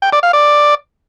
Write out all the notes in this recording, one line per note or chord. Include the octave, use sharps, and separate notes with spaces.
G5
D5
F5
D5